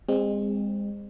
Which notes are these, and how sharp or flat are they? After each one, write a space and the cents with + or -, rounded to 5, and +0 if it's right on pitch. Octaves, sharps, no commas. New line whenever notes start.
G#3 -30 C4 +0